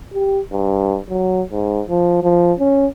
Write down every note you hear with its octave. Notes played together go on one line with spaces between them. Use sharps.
G4
G2
F#3
G#2
F3
F3
C#4